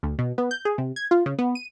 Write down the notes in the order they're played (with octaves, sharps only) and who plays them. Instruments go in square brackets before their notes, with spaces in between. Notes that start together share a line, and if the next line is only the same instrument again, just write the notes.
[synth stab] D2
B2
B3
G6
G#4
C3
G#6
F4
C#3
B3
D#7